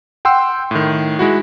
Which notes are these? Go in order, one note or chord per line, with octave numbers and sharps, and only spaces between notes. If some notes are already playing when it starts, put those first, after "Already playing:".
F#5 G5 C6 E6
A2 D#3
G#3 E4 F#4